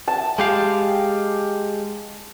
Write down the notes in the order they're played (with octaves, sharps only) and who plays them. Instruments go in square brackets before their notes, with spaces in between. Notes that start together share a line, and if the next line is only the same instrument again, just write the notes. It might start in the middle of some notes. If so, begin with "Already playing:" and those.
[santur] A5
[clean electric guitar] G#3 G4 F5